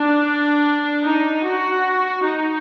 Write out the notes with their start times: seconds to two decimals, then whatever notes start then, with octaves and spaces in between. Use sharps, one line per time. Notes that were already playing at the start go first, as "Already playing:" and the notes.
Already playing: D4
1.03 D#4
1.44 F#4
2.24 D#4